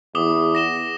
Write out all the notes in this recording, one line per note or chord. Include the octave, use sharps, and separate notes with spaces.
E2 D6 D#6 G7
A#6 E7 G7